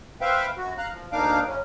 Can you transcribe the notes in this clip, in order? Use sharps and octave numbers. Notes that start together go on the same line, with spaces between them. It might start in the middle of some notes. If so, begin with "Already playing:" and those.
B4 C5 E5 F5 G5
F#2 F#4
F5 A#5 F#6
F3
D2 A#3 D4 D#4 F5 D6
F#2 C#3 F#3 C#4